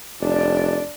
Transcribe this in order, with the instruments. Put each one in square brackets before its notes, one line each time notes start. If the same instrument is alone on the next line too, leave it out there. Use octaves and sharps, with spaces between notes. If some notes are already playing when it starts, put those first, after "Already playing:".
[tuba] F1 [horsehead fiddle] D4 D5